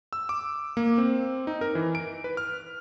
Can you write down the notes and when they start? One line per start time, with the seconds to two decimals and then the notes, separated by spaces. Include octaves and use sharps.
0.13 E6
0.29 D6
0.77 A#3
0.98 C4
1.47 D#4
1.61 A#4
1.75 E3
1.95 D7
2.24 B4
2.37 F6